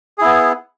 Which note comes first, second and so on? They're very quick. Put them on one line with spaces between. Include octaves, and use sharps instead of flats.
G#4 E4 B3